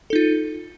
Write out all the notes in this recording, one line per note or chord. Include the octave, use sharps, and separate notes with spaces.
D#4 F4 A4